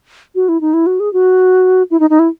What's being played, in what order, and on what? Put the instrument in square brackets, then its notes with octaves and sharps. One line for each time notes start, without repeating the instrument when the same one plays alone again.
[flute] F#4
E4
D#4
E4
F#4
G#4
F#4
E4
D#4
D#4
E4